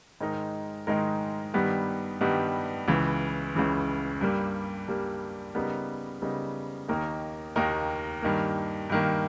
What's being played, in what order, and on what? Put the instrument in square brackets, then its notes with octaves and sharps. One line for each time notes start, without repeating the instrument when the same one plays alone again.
[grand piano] G#2 D#3 G#3 D#4 A#4
G#2 D#3 G#3 D#4 A#4
G2 D#3 G3 B3
G2 D#3 G3 B3
C#2 C#3 E3
C#2 C#3 E3
G2 G3 A#3
G2 G3 A#3
C#3 G3 B3 D#4 A#4
C#3 G3 B3 D#4 A#4
D#2 D#3 A#3 D#4 A#4
D#2 D#3 A#3 D#4 A#4
G2 D#3 A#3
G2 D#3 A#3